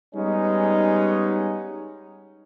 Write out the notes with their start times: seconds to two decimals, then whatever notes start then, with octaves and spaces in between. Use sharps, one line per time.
0.15 G3 G#3 B3 C#4 D#4